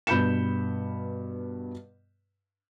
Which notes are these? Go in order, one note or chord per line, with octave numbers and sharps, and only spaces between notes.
G2 B2 B5 G6 C#7 E7